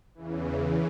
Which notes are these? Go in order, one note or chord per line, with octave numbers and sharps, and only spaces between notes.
E2 C#3 E3